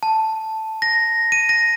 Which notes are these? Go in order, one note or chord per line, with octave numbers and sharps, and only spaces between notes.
A5
A#6
D#7
A#6